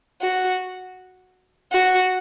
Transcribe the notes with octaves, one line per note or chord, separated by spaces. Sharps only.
F#4
F#4